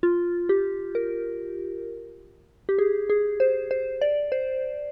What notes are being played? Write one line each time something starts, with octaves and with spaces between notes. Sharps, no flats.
F4
G4
A#4
G4
G#4
G#4
C5
C5
D5
C5